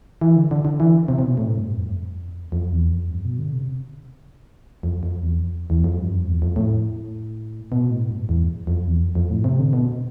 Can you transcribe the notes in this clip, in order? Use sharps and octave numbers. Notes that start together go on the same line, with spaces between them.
E3
D3
D3
D3
E3
C3
C3
B2
A2
G2
F2
F2
E2
F2
G2
B2
D3
C3
F2
F2
E2
F2
E2
F2
G2
F2
E2
F2
A2
B2
A2
G2
E2
F2
E2
F2
F2
A2
C3
D3
B2